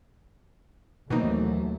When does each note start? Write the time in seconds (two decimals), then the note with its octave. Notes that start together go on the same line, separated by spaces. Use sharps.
1.10 D#2 B2 E3 F#3 A3 A#3 C4 D#4